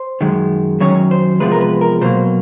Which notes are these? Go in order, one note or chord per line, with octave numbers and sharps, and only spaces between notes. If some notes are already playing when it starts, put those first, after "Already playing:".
Already playing: C5
F#2 D#3 G#3
F#2 D#3 F#3 C#4 C#5
C5
E2 C3 F3 G#3 B4
A#4
B4
A#4
B2 F#3 A#3 C5